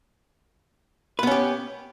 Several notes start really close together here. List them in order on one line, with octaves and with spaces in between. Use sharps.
B4 B3 C#4 G4